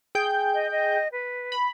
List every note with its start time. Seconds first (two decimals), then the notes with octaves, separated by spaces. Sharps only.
0.15 G#4 G5 G6
0.54 D#5
0.71 D#5
1.12 B4
1.52 B5